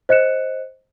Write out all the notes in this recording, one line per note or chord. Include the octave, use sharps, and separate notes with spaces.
C5 D#5 F#6 C#7 E7